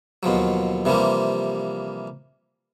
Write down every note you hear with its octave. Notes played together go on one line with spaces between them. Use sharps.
D#2 B2 F3 F#3
C3 E3 F3 G3 A#3